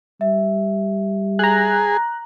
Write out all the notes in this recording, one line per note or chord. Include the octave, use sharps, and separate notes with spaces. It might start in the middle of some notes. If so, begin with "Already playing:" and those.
G3 E5
G#4 A#5 F#6